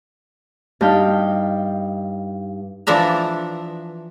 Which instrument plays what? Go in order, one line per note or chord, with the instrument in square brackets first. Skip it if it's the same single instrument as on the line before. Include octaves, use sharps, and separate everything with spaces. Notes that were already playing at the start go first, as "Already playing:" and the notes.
[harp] G2 D#4 F5 G5
[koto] E3 F3 D4 E5 A#5